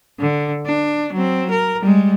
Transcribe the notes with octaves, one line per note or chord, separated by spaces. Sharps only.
D3
D4
F#3 C4
A#4
G3 G#3